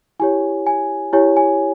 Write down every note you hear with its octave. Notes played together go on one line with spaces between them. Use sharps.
E4 G4 C#5 G#5
G#5
E4 G4 C#5 G#5
G#5